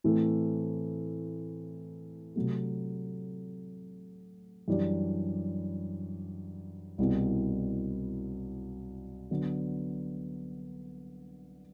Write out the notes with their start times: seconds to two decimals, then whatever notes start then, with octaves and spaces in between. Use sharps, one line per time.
0.04 A2 E3 A3 C4
2.36 C3 F#3 A3
4.68 F#2 E3 G3 D4
6.98 C2 B2 G3 C4 E4
9.31 D3 F#3 B3 D4